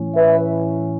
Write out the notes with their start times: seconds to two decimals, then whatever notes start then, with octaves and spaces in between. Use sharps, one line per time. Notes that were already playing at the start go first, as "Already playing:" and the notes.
Already playing: A2 E3 C#4
0.14 B4 E5